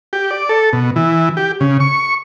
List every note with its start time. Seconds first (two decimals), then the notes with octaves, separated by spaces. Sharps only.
0.13 G4
0.31 D5
0.49 A4
0.73 B2
0.96 E3
1.37 G4
1.61 C#3
1.80 C#6